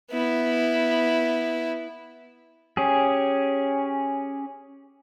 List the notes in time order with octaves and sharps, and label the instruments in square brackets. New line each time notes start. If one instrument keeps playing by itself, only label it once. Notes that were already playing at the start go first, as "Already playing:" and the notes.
[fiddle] B3 E4
[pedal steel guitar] C#4 G4 G#4